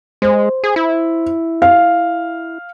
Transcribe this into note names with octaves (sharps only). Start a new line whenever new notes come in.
G#3 C5
G#4
E4
F5